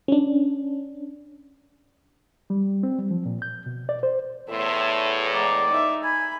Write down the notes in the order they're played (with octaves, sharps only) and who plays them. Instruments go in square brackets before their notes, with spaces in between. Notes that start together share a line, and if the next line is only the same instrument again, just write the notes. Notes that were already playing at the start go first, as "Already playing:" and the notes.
[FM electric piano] C#4 D4
[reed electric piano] G3
C4
G3
F3
A#2
G6
B2
D5
C5
[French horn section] E2 A2 [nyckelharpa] E5 C6
[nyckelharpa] G#3 A#5 [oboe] D5
[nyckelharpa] D#4 E5
[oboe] G#5 [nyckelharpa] B5